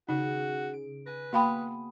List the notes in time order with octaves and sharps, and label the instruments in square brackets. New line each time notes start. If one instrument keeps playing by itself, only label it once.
[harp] C#3 [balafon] D#4 [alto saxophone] F#4
[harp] D7
[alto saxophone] B4 [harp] G#5 A#6
[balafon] A#3 F5 G5 [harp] B3 D#6 [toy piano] F#4 B5